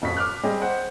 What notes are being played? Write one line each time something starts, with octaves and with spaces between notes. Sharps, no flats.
D#1 F2 F#4 B6
D6 F6 F#6
G3 C4 G#4 D#5
C5 F#5